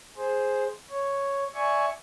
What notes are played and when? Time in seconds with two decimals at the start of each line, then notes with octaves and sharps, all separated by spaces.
0.17 G#4 C5
0.90 C#5
1.54 D5 E5 G#5 C#6